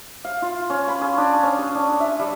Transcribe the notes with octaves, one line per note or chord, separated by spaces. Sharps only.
F5
F4
C#4
B5
G#4
D4
C#4
G#4
D4
E5
G3